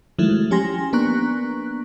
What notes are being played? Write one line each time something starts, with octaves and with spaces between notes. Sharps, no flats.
D#3 F3 F#3 G#3 A3 E4
F3 C#4 G4 G#5 C6 A#6
A#3 B3 D4 A#5 C#6 F#6